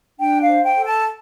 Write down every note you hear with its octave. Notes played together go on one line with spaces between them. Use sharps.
D4 G5
F5
C5
G5
A4
A5